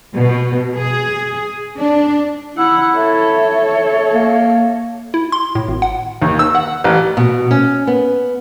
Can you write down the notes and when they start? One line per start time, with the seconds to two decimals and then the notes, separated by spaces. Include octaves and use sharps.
0.15 B2
0.76 G#4
1.77 D4
2.58 E4 F#5 E6
2.96 A4 C#5 E5
4.13 A#3
5.14 E4
5.32 C6
5.55 A2
5.68 G#1
5.82 F#5
6.22 D#2
6.39 E6
6.55 F#5
6.84 A1
7.17 B2
7.51 C#4
7.87 B3